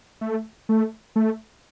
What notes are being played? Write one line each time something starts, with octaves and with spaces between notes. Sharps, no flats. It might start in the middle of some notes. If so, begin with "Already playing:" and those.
A3
A3
A3